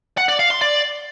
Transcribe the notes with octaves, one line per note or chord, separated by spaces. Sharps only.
F#5
D5
F5
C6
D5